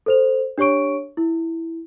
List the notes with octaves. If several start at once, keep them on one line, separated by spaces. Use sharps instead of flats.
A4 C5 F7
D4 G4 C#5 C#6 D7
E4